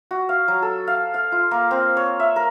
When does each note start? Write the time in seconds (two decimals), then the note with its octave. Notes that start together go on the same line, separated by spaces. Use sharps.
0.11 F#4
0.29 F5
0.48 F#3
0.62 A4
0.87 F5
1.14 F5
1.32 F4
1.51 A#3
1.71 C4
1.97 C#5
2.20 E5
2.36 A#4